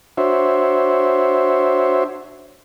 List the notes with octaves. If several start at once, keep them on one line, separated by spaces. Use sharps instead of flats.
D4 F#4 C5 C#5 E5